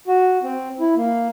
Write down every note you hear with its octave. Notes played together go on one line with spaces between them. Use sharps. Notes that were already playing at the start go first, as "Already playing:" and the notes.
F#4
C4
E4
A#3